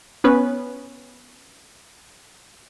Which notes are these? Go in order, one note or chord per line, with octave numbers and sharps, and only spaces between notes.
B3 C#4 B4